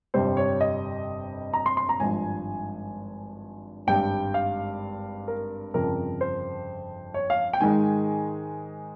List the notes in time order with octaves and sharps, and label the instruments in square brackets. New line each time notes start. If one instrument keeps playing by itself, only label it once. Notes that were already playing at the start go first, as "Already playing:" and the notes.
[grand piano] G1 F2 C3 G3 C4 C5
C#5
D#5
A#5
C6
C6
A#5
G#1 G2 F3 G#5
G#1 G2 G3 G5
F5
A#4
G1 F2 C#3 F3 C4 A#4
C5
C#5
F5
G5
G#2 D#3 G#3 D#4 G#5